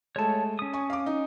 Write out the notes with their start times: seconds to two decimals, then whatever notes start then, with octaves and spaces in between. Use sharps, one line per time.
0.16 G#3 A3 C#5 A5
0.59 C#4 D#6
0.73 G#5 C#6
0.90 F5 D6
1.06 D#4